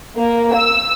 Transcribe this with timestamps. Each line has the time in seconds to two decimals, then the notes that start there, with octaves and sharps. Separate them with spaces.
0.17 A#3
0.55 E6